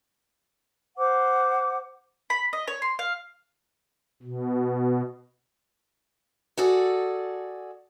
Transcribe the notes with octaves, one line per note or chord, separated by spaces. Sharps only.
C5 F#5 D6
B5
D#5
C#5
C6
F5
B2
F#4 G#4 A4 D5